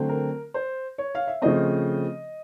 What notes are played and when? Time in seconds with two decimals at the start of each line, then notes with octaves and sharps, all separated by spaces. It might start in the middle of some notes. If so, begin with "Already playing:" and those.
Already playing: D3 F#3 A3 C4
0.09 A#4
0.54 C5
0.98 C#5
1.15 F5
1.27 E5
1.42 C#3 F3 A3 C4 D#5